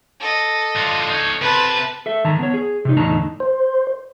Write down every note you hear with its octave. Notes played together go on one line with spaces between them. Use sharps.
A4 D#5
D3 F4
D#4 C#5
C3 B4 A5
A4 E5
D#3 A5 A#5
B3 C#5
G#4
C3 D#4
E2 A2 D3 D#4 A5 A#5
C5